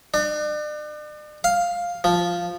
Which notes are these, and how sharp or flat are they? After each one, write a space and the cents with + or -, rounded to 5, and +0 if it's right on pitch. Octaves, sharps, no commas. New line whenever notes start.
D4 +40
F5 +5
F3 +0